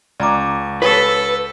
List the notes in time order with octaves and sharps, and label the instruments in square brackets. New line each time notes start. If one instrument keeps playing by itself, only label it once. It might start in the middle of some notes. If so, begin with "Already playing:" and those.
[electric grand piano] C#2 [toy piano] D5 A#5 D6
[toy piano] G4 C#5 D#6 [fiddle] A4 [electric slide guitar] B4